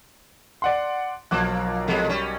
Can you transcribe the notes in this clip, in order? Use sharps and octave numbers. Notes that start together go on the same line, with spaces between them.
D5 F#5 C6
B1 F3 A#3 D6 F#6
F2 B2 G#3
G3 C#4